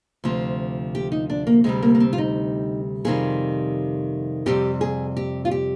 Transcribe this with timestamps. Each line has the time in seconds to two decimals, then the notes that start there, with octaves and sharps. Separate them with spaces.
0.24 D2 C3 F3
0.95 G4
1.12 D#4
1.30 D4
1.47 A#3
1.64 D2 C3 G3 G#3
1.82 A#3
1.95 A#3
2.00 C4
2.13 F4
2.18 D#4
3.05 F2 C3 D#3 G3 G#4
4.46 F2 C3 G3 G4
4.81 G#4
5.17 G4
5.45 F4
5.51 G4